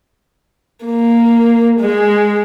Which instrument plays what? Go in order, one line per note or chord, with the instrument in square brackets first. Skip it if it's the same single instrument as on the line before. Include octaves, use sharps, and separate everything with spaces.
[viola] A#3
G#3